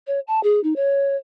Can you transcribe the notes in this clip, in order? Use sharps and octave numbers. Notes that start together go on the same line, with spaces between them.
C#5
A5
G#4
D#4
C#5